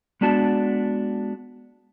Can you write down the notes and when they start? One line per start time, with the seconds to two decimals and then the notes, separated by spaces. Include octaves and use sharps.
0.21 G#3 B3 D4 F#4 A5